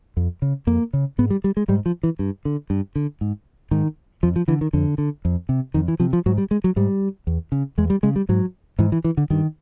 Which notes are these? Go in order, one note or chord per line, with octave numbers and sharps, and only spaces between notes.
F2
C#3
F2 A#3
C#3
G#2 B3
G3
G3
G#3
G#2 G3
F3
E3
G2
D3
G2
D3
G#2
G#2 D#3
F2 F3
F3
D3 E3
D#3
F2 D3
D3
F2
C3
F2 D#3
E3
C3 F3
F3
G#2 F#3
G3
G#3
F#3
G#2 G3
E2
C#3
E2 G#3
G3
C#3 G#3
G3
G#2 F#3
G#2 E3
E3
E3
D3
G2 D#3